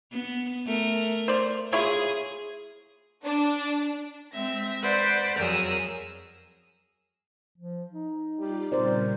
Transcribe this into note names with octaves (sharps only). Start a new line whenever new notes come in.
B3
A3 A#4
C5 D5
E4 F4 G#4 C#5
D4
G#3 C4 E5 A#6
B4 C5 D5 F#5
F2 F#3 G#4 A#4 D#6 E6
F3
D#4
G3 F4 D5
A#2 C#3 G3 C4 A#4 C5 D5